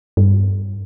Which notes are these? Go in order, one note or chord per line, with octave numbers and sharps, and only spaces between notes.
G2